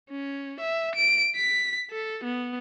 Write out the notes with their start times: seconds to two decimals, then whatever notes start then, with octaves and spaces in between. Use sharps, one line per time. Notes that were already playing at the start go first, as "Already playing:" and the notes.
0.10 C#4
0.60 E5
0.96 D7
1.36 B6
1.91 A4
2.24 B3